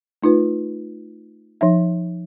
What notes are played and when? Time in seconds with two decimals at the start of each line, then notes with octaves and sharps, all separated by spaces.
0.22 A3 D#4 F4 B4
1.61 F3 D#4 E5